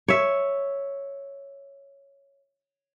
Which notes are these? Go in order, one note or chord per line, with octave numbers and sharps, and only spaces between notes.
C#5 E5